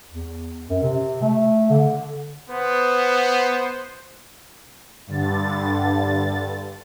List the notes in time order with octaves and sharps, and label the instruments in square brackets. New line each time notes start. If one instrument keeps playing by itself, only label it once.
[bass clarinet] E2
F#2
C3
A3
D3
[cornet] B3 [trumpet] C5
[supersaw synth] G2 D3 A6